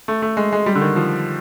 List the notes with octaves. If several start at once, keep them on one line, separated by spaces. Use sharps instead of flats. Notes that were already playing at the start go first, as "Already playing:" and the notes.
A3
A3
G#3
G#3
G3
D3
D#3
F3